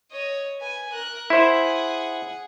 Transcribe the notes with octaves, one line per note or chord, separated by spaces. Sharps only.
C#5 D#5
B4 G#5
A#4 F#6
E4 G#4 C5 F#5